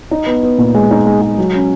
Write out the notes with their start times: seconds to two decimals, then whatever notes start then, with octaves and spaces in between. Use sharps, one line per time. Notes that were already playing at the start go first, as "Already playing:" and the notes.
0.11 D#4
0.26 B3
0.43 B3
0.58 A#2
0.75 G#3
0.91 D#4
1.06 G#3
1.22 G#3
1.38 F#3
1.54 C#4